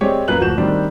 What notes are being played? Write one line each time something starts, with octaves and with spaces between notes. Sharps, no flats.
G#3 C4 G4 C#5 D5
F#2 A#3 B4 F#6 F#7
D1 F3 F#4 G6 E7
D#3 G3 C4 D4